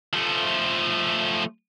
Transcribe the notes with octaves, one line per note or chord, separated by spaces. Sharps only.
F3 A3